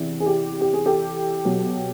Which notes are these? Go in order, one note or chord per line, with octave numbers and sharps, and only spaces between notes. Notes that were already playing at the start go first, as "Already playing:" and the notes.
Already playing: E2 C3 E3
G#4
G4
G4
G#4
G4 A4
B2 F#3